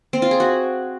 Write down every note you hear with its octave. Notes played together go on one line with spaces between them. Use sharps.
C4
F4
G#4
F#4